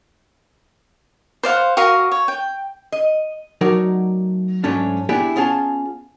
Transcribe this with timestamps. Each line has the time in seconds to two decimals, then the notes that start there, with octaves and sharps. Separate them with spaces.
1.43 C5 D5 F5 F#5
1.77 F#4 A#4 F5 D#6
2.12 C#5
2.28 G5
2.92 D#5
3.61 F#3 A3 D#4 A#4 C#5 D5
4.64 G#2 F#3 A3 C#4 D4
5.09 B3 D4 E4 G4 G#4
5.36 B3 C#4 F4 G#4 F5 A5